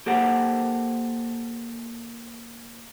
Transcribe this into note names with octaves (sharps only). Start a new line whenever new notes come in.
A#3 G4 A4 A#4 C5 F#5